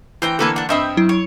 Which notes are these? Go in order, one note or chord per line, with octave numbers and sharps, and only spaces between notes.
E3 C5 G5 A#5
D3 E3 A#3 A4 B4 G#5
D4 F#5
G2 C4 D#5 E5 G5 B5
F#3 E4
C#5